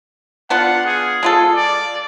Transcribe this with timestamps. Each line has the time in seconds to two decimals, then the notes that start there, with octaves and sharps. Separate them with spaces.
0.50 B3 D4 F4 F#5
0.86 G#4
1.23 G#3 F4 A4
1.55 D5